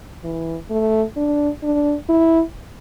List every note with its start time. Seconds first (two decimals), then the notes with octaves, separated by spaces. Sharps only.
0.24 E3
0.70 A3
1.17 D4
1.63 D4
2.09 E4